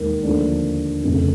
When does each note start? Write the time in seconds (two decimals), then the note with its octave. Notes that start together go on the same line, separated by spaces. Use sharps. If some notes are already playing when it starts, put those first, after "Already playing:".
Already playing: E1 D#2 D#3
0.23 D#2 D3 F3 A3 D4
1.04 F1 F2 C#3